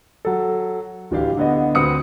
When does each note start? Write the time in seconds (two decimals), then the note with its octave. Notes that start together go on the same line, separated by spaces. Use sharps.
0.25 F#3 A4
1.11 D1 E3 D4 G4 F5
1.37 D3 B3 D#5
1.75 D2 C4 B4 D#6 C#7